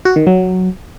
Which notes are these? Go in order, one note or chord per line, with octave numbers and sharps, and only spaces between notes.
F#4
D#3
F#3